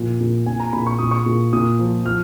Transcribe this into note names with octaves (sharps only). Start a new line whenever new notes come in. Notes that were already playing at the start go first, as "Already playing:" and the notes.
Already playing: A#2 F3
A#2
A#2 G#5
A#5
A#2 B5
C#6
A#2 D#6
C#6
A#2
A#2 D#6
F3
F3 F6